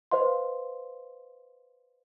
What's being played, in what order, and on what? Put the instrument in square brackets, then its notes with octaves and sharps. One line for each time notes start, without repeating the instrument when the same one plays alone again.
[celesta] B4 C5 D#5 F5 C6